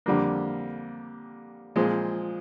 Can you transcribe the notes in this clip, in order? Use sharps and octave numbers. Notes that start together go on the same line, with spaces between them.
F2 D3 G3 A#3
A#2 F3 G#3 C4